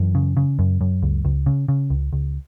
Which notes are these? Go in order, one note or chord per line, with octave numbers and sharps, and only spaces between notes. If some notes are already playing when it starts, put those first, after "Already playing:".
Already playing: F#2 E3
C#3
C#3
F#2
F#2
C#2
C#2
C#3
C#3
C#2
C#2